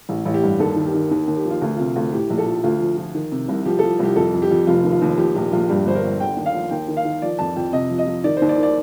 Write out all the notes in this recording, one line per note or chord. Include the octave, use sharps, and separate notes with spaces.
A1
A1
G4
G2
D#2 A4
D#3
G4
D#3
D#2
D#2
G4
F3
F4
D2
C3 F4
D2
A2 G4
A#1
A4
F3
D2 F4
F3
F3
D#3
C3
C2
F3 G4
A4
F3
C2 G4
F2 A4
F2
G4
F2
F1 F4
D#2
F4
D#2
F3 G4
A#1 G4
A#1 F4
G2 G4
G1 C5
A#4
G1
D3 G5
D#2
F5
F3
D#2 G5
D#3
F5
D#3
F3 D5
F2 A5
F2 G5
C3 D#5
F3
D#5
F3
D#3 D5
C5
D#2
D5
D#3
D5